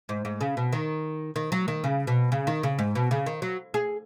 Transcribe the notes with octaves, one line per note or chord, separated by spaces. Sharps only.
G#2
G#2
C#3
B2
D#3
D#3
F#3
D#3
C#3
B2
C#3
D#3
C#3
G#2
B2
C#3
D#3
F#3
G#4